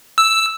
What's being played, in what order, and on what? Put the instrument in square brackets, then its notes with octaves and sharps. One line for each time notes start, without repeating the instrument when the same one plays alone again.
[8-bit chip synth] E6